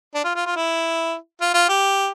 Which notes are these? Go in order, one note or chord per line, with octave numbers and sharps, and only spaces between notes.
D4
F4
F4
F4
E4
F4
F4
G4